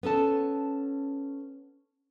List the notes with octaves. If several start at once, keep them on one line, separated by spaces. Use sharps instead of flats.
B3 C#4 A4 A5